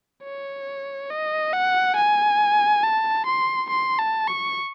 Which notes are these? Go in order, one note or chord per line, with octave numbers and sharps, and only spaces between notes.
C#5
D#5
F#5
G#5
A5
C6
C6
A5
C#6